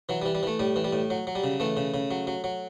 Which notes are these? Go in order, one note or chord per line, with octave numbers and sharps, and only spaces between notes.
E3 F#3
G3
E3
G3
E3 A3
A2 G3
E3
G3
A2
F#3
F#3
G3
C#3
E3 A3
C#3
C#3
F#3
F#3
F#3